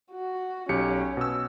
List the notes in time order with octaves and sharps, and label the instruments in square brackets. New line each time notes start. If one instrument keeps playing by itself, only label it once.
[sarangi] F#4
[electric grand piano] B1 G4 C#7 [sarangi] C#4
[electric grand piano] B2 E6